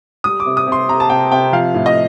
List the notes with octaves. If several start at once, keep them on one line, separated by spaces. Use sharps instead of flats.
G3 D#6
D6
C3
D#6
C3
C6
C3 A#5
A5
C3 G5
C3 G5
F3 F5
A2
D#5